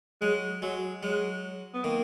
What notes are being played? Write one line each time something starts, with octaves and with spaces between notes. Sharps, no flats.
F#3 G#3
F#3 G#3
F#3 G#3
B3
D#3 A#3